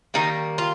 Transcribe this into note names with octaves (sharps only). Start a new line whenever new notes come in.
D#3 G3 A#3 D#4
F4